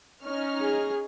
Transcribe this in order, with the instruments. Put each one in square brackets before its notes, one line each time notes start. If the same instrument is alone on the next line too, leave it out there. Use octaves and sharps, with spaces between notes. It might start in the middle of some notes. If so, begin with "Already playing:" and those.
[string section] C#4 D#4 F6
[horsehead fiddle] G#4